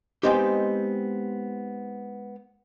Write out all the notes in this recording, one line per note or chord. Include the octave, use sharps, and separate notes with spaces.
G#3 A3 B3 C4 D#4 G4